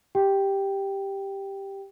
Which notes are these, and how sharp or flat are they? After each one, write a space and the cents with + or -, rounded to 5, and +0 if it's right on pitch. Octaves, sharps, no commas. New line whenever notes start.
G4 +0 G5 +0